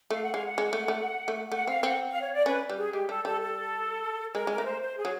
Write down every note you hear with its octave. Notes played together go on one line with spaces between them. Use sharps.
A3 F5
F#5
G#3 F5
F#5
G#3
A3
A3
A3
A3 F#5
C4 F5
C4 F#5
F5
C#5
D5
C#4 B4
G3
G#4
G#3 G4
G3 A4
G3 A4
A4
G#3 A#4
G#3 A#4
A3
C5
C5
G#4
F#3